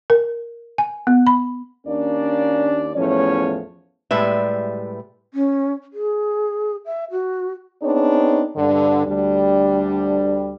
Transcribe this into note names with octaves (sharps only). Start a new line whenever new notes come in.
A#4
G#5
B3
B5
D#2 A#3 C#4 D4 D5
E2 A2 F3 A3 C#4 C#5
A2 G3 G#3 B4 E5
C#4
G#4
E5
F#4
B3 C4 D4 D#4 G#4 C#5
G2 D3
D2 G3 D4